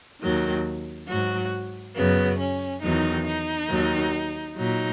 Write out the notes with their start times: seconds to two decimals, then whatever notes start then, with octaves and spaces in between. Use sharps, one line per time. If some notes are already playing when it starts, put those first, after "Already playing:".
0.21 D#2 D#3 F#3
1.07 G#2 F#3 F#4
1.95 F#2 C#3 F#3 B3
2.39 C#4
2.82 E2 D#3 F#3 D#4
3.26 D#4
3.69 D#2 D#3 F#3
4.56 A#2 F#3 D#4